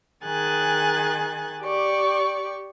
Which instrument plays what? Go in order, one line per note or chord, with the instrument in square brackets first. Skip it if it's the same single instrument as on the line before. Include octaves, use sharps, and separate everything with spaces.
[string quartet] D#3 G#4 G#5 F#6 A6
G4 D5 C#6